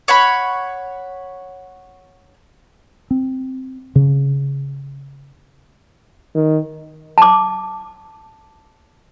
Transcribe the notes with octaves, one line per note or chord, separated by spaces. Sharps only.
C#5 F#5 B5
C4
C#3
D#3
A5 D6